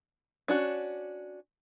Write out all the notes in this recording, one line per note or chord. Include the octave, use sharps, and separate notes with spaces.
C#4 D4 F#4